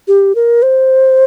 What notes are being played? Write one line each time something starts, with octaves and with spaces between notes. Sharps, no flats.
G4
A#4
C5